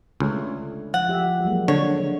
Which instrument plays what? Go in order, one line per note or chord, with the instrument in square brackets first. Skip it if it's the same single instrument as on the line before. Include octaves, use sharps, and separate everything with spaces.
[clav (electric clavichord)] C#2 [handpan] D3 A3 C#5
[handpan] F3 [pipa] F#5
[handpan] F3 G4 E5
F#3 G#3 A#3
[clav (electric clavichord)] D3 [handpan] F#4 [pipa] C#5